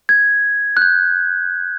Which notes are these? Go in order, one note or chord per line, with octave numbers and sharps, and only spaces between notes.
G#6
F#6
G6